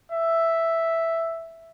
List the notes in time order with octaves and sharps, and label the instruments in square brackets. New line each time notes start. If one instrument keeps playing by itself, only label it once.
[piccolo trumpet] E5